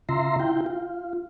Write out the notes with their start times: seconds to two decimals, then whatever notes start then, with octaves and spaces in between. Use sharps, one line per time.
0.09 C#3 F4 E5 A#5 C6
0.40 E4 F4 G5
0.66 F4